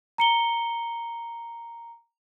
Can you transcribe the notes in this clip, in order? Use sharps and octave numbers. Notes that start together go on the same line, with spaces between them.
A#5 C#7 G7